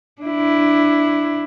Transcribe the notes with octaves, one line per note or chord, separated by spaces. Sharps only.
D4 E4